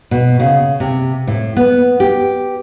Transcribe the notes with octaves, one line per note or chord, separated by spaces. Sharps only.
B2
C#3
C3
A2
B3
G4